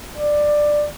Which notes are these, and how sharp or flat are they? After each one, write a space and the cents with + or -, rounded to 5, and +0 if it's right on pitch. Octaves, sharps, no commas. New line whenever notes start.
D5 +10